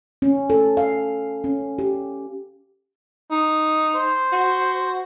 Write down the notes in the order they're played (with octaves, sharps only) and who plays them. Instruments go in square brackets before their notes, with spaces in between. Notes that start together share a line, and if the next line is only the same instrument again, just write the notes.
[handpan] C#4
A4
F5
C#4
G4
[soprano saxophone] D#4
[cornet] C5
[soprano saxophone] F#4